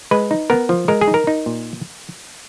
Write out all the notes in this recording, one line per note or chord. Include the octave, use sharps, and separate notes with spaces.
G#3 B4
D#4
B3 A#4
F3
G#3 A#4
G#4
D#4
A#4
D#4
A#2